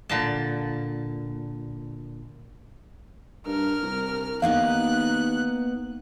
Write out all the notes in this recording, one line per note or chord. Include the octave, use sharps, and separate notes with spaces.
A#2 D3 A5
G2 A#4 F6
C2
D#2 A#3 B3 D#4 F5 F#6